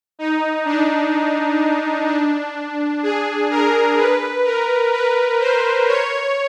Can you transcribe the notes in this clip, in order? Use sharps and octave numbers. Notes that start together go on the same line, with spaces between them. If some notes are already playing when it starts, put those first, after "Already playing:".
D#4
D4
D4
G#4
A#4
B4
A#4
B4
C5
C#5